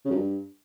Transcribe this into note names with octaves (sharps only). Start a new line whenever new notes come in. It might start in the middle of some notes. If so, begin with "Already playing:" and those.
C#3
F#2
G2